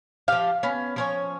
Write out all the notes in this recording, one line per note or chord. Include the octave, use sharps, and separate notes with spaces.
F3 G4 F5
B3 C#4
F3 C#4 C#5